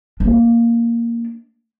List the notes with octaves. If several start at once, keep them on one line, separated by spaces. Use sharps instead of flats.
A#3 D4